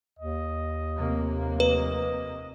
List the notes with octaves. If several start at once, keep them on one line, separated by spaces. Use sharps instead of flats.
D#2 D#5
F1 C3 A#3
B4 D#5